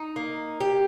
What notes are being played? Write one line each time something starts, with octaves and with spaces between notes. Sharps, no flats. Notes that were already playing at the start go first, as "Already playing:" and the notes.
Already playing: D#4
A#3
G4